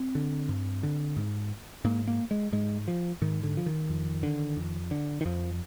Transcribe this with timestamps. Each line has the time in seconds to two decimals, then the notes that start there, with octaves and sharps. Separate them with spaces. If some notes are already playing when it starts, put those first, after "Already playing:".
Already playing: C4
0.15 D3
0.49 G2
0.83 D3
1.17 G#2
1.85 G#2 A#3
2.07 A#3
2.31 G#3
2.52 G#2 G#3
2.88 F3
3.22 G#2 D#3
3.43 D3
3.57 F3
3.66 D#3
3.90 F2
4.23 D3
4.57 F2
4.91 D3
5.21 D#3
5.25 F2 F3